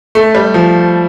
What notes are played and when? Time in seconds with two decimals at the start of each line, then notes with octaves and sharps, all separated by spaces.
0.15 A3
0.35 G3
0.54 F3